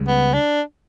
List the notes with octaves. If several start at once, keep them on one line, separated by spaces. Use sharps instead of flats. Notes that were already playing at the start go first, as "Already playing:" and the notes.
Already playing: C#2 C#3 G3
B3
D4